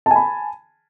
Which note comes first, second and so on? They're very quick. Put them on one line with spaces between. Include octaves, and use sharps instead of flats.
A5 G#5 B5